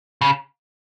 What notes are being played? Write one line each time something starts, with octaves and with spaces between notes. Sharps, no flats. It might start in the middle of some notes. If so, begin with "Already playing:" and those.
C#3